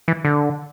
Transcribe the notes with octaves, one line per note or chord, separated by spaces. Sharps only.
E3
D3